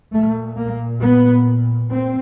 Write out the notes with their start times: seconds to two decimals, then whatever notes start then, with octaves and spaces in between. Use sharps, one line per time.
0.13 A#2 A3
0.57 A#3
1.02 B3
1.91 A#2 C4